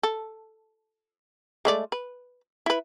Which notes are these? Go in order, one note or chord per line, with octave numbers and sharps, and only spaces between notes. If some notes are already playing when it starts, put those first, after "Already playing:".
A4
G#3 A3 D5
B4
E4 B4